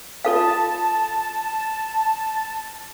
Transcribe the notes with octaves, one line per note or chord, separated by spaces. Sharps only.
F4 A4 F5 A5